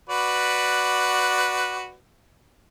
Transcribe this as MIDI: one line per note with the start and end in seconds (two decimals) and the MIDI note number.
0.09 1.94 66
0.09 1.94 71
0.09 1.94 74